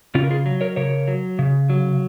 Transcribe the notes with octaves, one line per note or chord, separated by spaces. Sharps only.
C#3 C#4 F4
A#4
F4 G#4
F#3
A#4 C#5
C#3 A#4 C#5
F#3
C#3
F#3